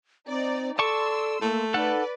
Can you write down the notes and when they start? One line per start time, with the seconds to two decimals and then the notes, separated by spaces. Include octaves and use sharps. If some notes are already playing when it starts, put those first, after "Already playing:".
0.28 C4 D#4 D5
0.79 A4 D5 A5 C6 C#6 E6
1.42 A3 A#3
1.74 D#4 A4 B4 D5 F#5